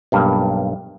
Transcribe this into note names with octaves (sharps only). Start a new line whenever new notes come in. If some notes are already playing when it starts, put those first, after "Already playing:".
B1 G2 A#3